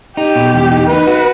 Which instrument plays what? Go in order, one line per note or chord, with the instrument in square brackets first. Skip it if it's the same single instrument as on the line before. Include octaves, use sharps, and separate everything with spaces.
[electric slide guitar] D#4 [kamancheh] G4
[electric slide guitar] B2
E2
D#4
[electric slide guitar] D#4 [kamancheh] B4
[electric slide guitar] F#4